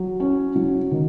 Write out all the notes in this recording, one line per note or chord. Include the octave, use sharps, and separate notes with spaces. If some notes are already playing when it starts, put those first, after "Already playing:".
Already playing: F#3
C#4
F#3
D#3